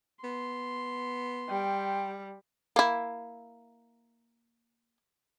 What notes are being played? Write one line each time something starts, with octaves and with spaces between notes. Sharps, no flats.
B3 C6
G3 G5
A#3 E4